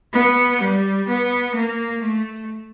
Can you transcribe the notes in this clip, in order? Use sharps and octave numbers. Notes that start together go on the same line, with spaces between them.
B3
G3
B3
A#3
A3